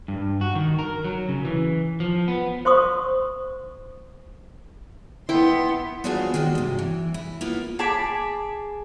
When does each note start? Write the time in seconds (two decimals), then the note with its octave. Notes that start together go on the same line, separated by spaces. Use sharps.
0.08 G2
0.41 F#4
0.55 D#3
0.79 A#4
1.04 F#3
1.29 C#3
1.45 E3
2.00 F3
2.28 B3
2.65 C5 C6 C#6 D#6
5.29 B3 E4 G5 C6
6.04 B3 D4 F4 F#4 G#4 C5
6.34 D#3 G#3 F#4 G4
6.55 G2 C3
6.79 E3
7.14 E4
7.41 A#3 B3 E4 F4
7.79 G#4 A5 B5 D6